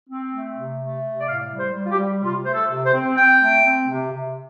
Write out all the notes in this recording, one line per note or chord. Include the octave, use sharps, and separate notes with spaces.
C4
A3
C3
A3
C3
D5
A2 F5
G3
C5
G3
F4
G4
G3
C3 F4
A3 C5
A4
C3
C5
C4
C4 G5
A3
C4
C3
C3